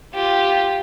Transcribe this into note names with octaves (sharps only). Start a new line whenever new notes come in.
F4 G4